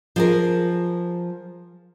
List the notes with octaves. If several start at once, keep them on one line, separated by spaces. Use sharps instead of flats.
F3 G#4 A#4